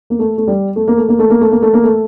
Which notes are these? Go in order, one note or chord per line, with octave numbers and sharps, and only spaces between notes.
A#3
A3
A3
G3
A3
A#3
A3
A#3
A3
A#3
A3
A#3
A3
A#3
A3